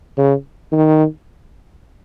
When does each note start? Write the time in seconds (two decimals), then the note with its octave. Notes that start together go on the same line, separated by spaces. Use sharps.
0.18 C#3
0.72 D#3